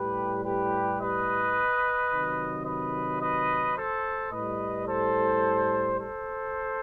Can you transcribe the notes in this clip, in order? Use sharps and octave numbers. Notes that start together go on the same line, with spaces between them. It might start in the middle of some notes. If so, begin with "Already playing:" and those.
Already playing: A2 G3 G4 B4
G4 B4
B4 D#5
C3 D#3 F#3
B4 D#5
B4 D#5
A4 C5
A2 G3 B4 D#5
A4 C5
A4 C5